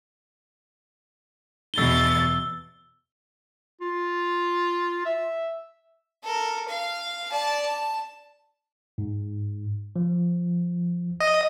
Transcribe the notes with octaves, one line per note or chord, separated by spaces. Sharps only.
E2 B2 E6 A6 G7
F4
E5
A4 A#4
F5
D5 A5
A5
G#2
F3
D#5